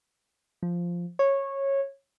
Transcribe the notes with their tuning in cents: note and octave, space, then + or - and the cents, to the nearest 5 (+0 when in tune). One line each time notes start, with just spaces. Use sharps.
F3 -5
C#5 -15